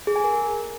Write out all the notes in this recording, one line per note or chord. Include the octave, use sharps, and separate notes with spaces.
G#4
G#5
A#4